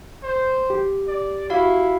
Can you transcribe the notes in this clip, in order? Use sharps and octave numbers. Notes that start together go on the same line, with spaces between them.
C5
G4
D5
E4 F#4 F5